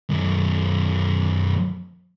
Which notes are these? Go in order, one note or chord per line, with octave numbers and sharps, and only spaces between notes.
F#2 D#3